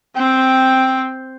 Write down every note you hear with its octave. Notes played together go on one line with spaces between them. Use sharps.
C4 G5